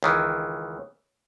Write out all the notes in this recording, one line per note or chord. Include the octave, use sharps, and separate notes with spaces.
C#2 D#3 E3